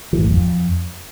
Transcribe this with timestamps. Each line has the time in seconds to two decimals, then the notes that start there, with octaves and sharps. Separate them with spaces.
0.13 E3
0.18 A2
0.23 F2
0.29 F#2
0.34 F2